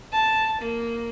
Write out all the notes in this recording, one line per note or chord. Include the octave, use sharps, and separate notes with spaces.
A5
A#3